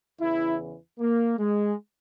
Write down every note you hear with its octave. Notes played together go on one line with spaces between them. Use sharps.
E2 C#3 E3 E4
A#3
G#3